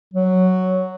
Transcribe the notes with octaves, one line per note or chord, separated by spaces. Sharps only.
F#3